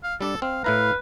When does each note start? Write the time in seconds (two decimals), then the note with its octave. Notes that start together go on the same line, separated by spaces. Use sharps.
0.03 F5
0.21 G3 D4 A4 D5
0.42 C4 F5
0.64 A2 E4 B4 F5 A#5